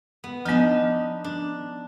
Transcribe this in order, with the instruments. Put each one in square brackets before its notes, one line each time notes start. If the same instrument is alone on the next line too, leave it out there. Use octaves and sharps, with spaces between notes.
[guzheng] B3
[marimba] F3 B3 [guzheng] D4 D#4
[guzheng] D4